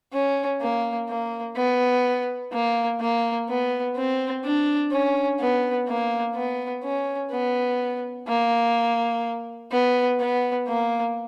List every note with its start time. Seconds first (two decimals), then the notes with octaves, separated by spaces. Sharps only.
0.13 C#4
0.61 A#3
1.09 A#3
1.56 B3
2.53 A#3
3.01 A#3
3.49 B3
3.97 C4
4.44 D4
4.92 C#4
5.41 B3
5.88 A#3
6.36 B3
6.84 C#4
7.32 B3
8.28 A#3
9.72 B3
10.20 B3
10.68 A#3